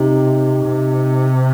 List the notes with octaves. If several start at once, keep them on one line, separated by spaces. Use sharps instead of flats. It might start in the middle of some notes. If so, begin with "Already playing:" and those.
Already playing: C3 D#4 G4
C3